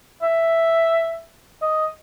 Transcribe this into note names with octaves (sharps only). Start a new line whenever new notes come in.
E5
D#5